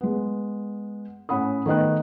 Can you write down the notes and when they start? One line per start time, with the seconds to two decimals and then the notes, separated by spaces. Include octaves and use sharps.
0.01 G#3 B3
1.29 A2 C#4 F#5 B5 D#6
1.66 D#3 A3 B3 D#5 G5 F#6